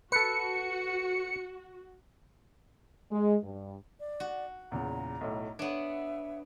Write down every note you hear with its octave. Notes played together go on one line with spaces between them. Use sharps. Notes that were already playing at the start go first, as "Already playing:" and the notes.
F#4 A4 B4 C#7
G#3
G2
D5
F#4
E2 A#2 C#3 A#5
B1 A2
B3 D4 C#5 E5